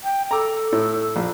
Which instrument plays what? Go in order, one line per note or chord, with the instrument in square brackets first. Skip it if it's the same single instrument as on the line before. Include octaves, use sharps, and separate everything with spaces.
[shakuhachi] G5
[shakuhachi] A4 [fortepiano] A#5 D6
[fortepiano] A2
A#1